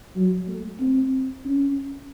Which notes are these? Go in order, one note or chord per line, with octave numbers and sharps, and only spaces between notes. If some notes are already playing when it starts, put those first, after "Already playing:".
F#3
A3
C4
C#4